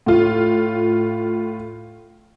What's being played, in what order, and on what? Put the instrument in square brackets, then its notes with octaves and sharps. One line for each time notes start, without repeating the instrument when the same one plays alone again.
[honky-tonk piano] A2 F4